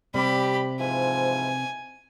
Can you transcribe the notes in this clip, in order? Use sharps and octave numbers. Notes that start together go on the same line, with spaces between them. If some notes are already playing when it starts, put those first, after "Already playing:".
C3 G3 C4 G4 B5
G#2 E3 F3 G#5